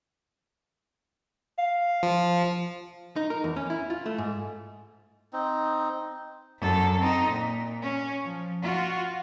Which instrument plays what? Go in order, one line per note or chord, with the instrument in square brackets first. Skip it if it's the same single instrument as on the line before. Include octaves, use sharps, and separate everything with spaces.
[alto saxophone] F5
[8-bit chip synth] F3
[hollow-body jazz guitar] D#4
A#4
E2
C#4
E4
F4
A3
G#2
[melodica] C4 D#4
[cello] F#2 A4
C4 D#4
A#2
C#4
F3
F4 F#4